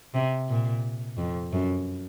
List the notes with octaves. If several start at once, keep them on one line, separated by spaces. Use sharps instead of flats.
C3
A#2
F2
F#2